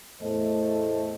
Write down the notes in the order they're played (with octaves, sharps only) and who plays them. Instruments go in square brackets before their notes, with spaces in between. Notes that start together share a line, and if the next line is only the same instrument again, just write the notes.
[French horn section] E2 A2 A3 A4 C5 D#5